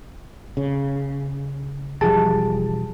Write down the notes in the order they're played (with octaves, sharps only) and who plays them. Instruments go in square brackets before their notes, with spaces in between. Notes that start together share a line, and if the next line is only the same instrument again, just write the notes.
[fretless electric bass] C#3
[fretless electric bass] E1 F3 G3 [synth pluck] G#4 A5